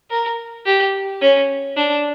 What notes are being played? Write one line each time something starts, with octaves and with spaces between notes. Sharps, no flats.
A#4
G4
C#4
D4